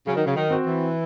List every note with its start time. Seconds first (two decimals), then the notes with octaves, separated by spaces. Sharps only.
0.06 C#3 F#3
0.16 D#3
0.26 C#3
0.35 D#3
0.50 C4 F#4
0.65 E3